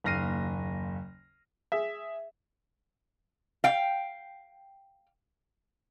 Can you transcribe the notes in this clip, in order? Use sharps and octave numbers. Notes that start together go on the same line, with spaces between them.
F#1 D#2 F6 A#6 C7 D#7
G#4 E5
F5 G5